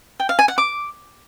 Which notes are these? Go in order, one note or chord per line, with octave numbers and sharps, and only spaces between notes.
G5
F5
G#5
F#5
D6